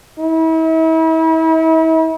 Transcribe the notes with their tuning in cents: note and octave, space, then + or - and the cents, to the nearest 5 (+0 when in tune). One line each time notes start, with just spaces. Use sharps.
E4 -40